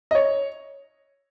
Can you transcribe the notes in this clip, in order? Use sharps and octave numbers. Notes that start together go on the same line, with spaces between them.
D#5
C#5